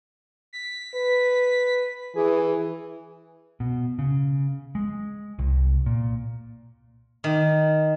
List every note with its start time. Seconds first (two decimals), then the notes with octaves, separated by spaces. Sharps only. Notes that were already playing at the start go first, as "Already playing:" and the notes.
0.53 B6
0.94 B4
2.15 E3 G#4
3.60 B2
3.99 C#3
4.75 G#3
5.39 C2
5.86 A#2
7.24 D#3